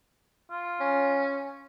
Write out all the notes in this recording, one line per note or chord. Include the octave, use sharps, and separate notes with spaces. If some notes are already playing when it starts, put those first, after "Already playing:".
F4
C#4